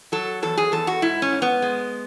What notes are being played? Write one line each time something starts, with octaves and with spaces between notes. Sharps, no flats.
F#3 A4
E2 A4
G#4
E2 A4
F#4
G#2 E4
C#4
G#2
B3
G#3